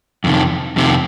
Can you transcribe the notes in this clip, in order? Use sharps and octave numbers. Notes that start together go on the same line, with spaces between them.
F2 C3 D#3
F2 C3 D#3